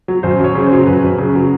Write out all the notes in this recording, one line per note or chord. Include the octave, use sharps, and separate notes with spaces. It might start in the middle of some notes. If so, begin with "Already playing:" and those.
F#3
F#2 C5
F#2 C#5
C#3
C5
F#3
F#2 B4
F#2
C#3
F#3